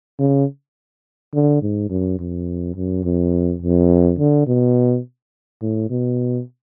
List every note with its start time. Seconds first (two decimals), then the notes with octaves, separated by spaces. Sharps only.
0.19 C#3
1.34 D3
1.62 G#2
1.90 F#2
2.19 F2
2.76 F#2
3.04 F2
3.62 F2
4.19 D3
4.47 B2
5.62 A2
5.90 B2